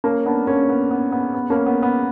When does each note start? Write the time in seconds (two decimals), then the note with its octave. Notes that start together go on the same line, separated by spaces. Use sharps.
0.04 A#3 C#4
0.25 B3 D4
0.47 A#3 C#4
0.69 B3
0.91 B3
1.12 B3
1.34 B3
1.50 A#3 C#4
1.66 B3
1.83 B3